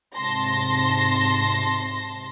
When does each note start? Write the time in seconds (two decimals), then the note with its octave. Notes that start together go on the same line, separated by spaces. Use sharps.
0.16 G#2 C3 A5 C6 A#6